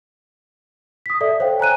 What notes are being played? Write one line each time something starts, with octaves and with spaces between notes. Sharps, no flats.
D#6 B6
A4 D5 E5
C5 C#5 F5 G5
G#5 A#5 F#6 D#7